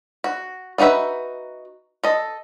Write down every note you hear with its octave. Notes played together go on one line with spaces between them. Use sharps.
F#4
B3 D#4 F#4 B4 E5
A4 D#5